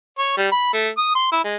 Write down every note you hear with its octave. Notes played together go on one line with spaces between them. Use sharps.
C#5
G3
B5
A3
D#6
C6
E4
G#3